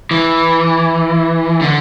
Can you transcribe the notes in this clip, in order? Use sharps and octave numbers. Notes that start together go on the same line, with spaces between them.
E3
D3